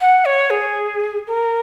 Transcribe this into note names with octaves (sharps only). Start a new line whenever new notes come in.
F#5
C#5
G#4
A#4